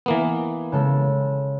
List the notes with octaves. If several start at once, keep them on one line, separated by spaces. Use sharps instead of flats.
E3 A#3 B3
C#3 G#3 A4